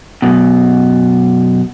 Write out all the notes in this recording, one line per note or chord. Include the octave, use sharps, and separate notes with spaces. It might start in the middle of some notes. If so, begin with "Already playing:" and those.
F#2 B2